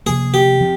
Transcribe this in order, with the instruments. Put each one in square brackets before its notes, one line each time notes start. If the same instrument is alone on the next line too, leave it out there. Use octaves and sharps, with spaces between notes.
[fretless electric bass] C3 F3 A#3 [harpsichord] G#4
[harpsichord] G4
[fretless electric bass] F3 C4